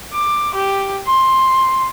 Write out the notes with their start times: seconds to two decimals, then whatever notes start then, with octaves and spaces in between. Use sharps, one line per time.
0.13 D6
0.54 G4
1.06 C6